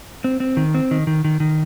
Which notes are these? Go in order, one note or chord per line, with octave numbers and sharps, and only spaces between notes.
C4
C4
D#3
C4
D#3
D#3
D#3
D#3